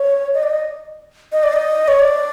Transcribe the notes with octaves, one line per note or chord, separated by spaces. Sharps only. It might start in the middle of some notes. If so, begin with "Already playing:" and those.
Already playing: C#5
D#5
D5
D#5
D#5
D5
D#5
C#5
D5